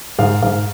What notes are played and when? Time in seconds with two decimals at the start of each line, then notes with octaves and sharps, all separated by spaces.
0.19 G#2 F5
0.43 G#2 F5